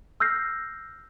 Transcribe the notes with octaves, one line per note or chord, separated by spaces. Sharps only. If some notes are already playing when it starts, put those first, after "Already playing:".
E6 F6 G6 A#6 C7